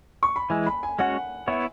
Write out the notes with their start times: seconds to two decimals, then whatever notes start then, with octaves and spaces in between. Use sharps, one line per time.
0.23 C#6
0.36 B5
0.50 E3 G#3 E4 G#5
0.66 B5
0.83 G#5
0.99 G#3 C#4 F#4 C#5 F#5
1.47 B3 E4 C#5 E5